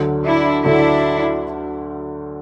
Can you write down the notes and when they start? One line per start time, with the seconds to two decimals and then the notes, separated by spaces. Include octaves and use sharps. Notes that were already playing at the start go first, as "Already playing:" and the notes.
Already playing: D2 D3 F#3
0.25 D4 E4
0.64 D2 D3 F#3 D4 E4